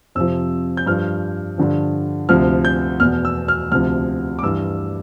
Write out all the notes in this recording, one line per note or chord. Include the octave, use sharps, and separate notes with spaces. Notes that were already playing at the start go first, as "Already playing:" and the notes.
F2 C3 F3 E6
G6
G2 F3 F6
G2 D3 F3
D2 C3 F3 F6
G6
E2 B2 F6
E6
F6
D2 C3 F3 F6
D6
G2 E3 E6